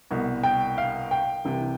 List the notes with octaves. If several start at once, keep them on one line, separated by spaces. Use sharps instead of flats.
C2 B2
G5
F5
G5
C2 C3 E3